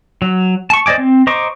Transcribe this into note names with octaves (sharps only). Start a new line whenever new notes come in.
F#3
A5 C#6
C5 D5 D#5 G#5 D6
C4
C5 D#5 A#5 C#6 D6